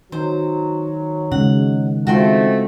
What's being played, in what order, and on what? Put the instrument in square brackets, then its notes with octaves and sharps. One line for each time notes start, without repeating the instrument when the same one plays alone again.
[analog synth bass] D#3 [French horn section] F#3 [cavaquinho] C5
[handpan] C#3 G#3 [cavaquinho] F#5
[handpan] G#3 F4 [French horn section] A3 C4 [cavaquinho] F#4 G5 C6